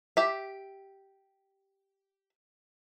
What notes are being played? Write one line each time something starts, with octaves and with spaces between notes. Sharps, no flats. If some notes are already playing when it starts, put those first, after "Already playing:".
G4 E5